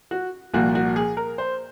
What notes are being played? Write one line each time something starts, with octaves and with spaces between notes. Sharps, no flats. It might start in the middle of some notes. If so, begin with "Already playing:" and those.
F#4
C2 A#2 F3 A#3 F#4
F#4
G#4
A#4
C5